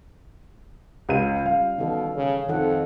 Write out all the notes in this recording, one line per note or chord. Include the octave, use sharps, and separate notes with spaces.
C#2 C#4 F4 D#7
G3 F5
B2 D#3 E3 A4
C#3
F2 D#3 A4 F#5